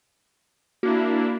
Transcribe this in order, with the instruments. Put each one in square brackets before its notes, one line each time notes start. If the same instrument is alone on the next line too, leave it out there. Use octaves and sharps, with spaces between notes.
[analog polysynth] A#3 D4 E4 [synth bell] F#4